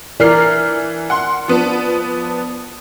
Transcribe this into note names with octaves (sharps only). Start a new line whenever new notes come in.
E3 A#4 D5 F6 C7
F#5 C6
F3 B3 D4